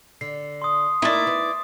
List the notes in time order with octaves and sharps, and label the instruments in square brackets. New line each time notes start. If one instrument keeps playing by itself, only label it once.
[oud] D3 [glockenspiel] C7
[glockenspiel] C6 D#6
[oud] A#3 D#4 [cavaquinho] E4 D5
[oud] B3